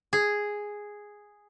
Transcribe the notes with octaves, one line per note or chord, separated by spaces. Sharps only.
G#4